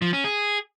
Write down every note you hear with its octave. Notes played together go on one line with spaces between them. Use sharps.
F3
C#4
G#4